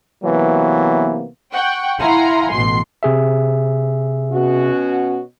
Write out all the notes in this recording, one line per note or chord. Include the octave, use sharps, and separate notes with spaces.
C3 E3 F#3 A#3 B3
F#5 G5 C#6
E4 F5 F#5 G#5 A#5 C6
A1 B2 C6 C7
C3 G#4 E5
B2 C#4 F#4